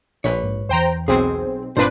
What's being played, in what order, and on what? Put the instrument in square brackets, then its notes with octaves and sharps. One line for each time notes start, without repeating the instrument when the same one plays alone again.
[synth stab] A#1 [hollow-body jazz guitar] B4 C#5
[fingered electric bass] G#2
[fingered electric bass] E2 E3 [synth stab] C5 G5 A#5
[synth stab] B1 C4 [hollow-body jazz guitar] G#4 C5
[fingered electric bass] G1 [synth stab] A#2 D4 B4 [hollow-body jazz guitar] C4 C5